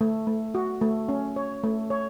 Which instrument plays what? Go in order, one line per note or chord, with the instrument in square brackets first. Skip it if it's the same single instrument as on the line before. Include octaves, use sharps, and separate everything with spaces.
[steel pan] A3
A3
F#4
A3
C#4
C#5
A3
C#5